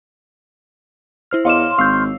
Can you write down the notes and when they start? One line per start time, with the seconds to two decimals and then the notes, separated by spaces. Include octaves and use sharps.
1.31 E4 C5 F6
1.45 E2 C#5 D#5 F5 C6 D6 F6 E7
1.78 G#1 F5 C#6 E6 G6 C7